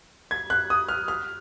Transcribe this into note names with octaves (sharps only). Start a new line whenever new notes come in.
G#6
F#6
D#6
F6
F6